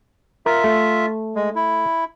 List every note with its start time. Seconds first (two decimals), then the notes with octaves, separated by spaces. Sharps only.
0.46 F4 A#4 E5
0.64 A3
1.35 G#3
1.56 E4